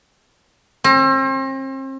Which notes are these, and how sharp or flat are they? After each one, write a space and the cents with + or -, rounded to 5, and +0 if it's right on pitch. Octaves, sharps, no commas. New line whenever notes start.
C4 +40